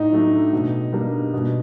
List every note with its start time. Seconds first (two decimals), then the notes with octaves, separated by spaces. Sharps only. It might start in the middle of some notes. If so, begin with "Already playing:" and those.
Already playing: A2 D#4
0.12 F#3 A3 D4
0.53 B2
0.93 G3 A#3 D4
1.33 B2